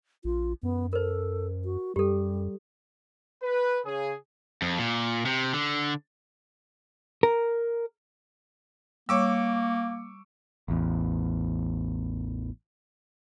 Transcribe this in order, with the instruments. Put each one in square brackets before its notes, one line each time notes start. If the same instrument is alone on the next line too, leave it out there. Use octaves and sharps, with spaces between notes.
[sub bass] A#1 [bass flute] F4
[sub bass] F#2 [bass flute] B3
[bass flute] A4 [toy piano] A#4 C5
[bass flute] F#4
[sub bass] F#2 [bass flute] G3 [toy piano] G4 A4
[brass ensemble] B4
C#3 G#4
[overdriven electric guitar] F2
A#2
C3
D3
[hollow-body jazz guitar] A#4
[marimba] G3 C#5 [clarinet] A#3 [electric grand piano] C#6 D6 E6
[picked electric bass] A1 E2